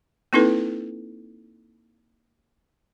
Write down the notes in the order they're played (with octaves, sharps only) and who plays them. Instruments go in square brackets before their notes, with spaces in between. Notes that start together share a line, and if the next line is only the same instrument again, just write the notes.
[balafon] A#3 C4 D#4 E4 A4 B4